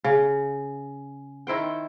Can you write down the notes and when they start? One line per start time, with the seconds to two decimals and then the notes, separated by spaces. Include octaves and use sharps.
0.04 C#3
1.47 D#3 E4 C5 G5